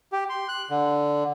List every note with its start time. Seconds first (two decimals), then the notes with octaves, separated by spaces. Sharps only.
0.12 G4
0.29 C6
0.48 F#6
0.70 D3